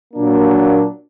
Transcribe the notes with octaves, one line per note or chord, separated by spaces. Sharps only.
A#2 F#3 A#3 D4